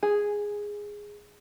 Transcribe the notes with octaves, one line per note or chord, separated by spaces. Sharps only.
G#4